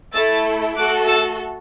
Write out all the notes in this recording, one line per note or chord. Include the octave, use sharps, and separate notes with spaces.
A3 E4 A4 E6 A6
A3 F#4 A4 D6 F#6
E6 A6